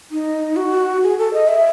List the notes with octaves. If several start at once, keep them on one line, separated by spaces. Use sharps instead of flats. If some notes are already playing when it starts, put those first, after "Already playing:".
D#4
F#4
G#4
A4
D#5
E5